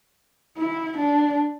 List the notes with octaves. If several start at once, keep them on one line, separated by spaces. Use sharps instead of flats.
E4
D4